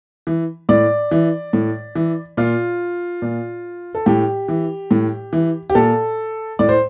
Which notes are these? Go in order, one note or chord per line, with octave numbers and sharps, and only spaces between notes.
E3
A2 D5
E3
A2
E3
A#2 F4
A#2
A4
A2 G4
E3
A2
E3
G4
A#2 A4
A2 D5
C5